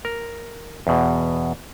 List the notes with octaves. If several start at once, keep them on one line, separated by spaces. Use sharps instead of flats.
A#4
E2 B2